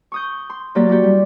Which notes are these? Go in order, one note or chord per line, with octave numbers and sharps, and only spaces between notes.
C#6 D#6 G6
C6
F#3 A#3 G4 D5
A#3 E4 F#4 G4
G3